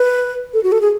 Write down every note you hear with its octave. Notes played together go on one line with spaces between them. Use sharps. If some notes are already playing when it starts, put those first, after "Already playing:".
Already playing: B4
A4
F#4
A4
G#4